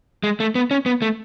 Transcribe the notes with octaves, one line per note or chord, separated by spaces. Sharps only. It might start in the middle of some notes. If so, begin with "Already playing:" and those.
G#3
A3
B3
C#4
B3
A3